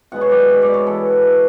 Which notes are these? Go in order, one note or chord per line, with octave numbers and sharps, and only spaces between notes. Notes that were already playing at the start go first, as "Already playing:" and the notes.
B2 G#3 B3 F#5
C#5
D5
E5
D5
C#5
E3 B3 A4